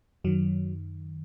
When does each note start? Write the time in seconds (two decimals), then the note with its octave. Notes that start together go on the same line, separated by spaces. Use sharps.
0.24 F#2 D#3 F#3